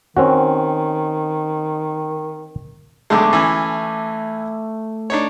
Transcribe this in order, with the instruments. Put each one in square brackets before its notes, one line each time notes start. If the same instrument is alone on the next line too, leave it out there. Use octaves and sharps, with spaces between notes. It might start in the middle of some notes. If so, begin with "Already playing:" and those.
[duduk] D#3 [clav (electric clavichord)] C4 C#4 F#4
[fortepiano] B1 D3 G#3 [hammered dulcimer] A3 D6
[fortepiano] E3 C#4
D4 D#4 C#5